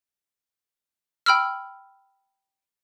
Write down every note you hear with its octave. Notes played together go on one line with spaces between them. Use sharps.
G5 B5 E6 F6